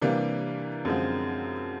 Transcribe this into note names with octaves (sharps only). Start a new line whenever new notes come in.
C3 E3 G3 A#3 D4
F#2 D3 F3 G#3 C4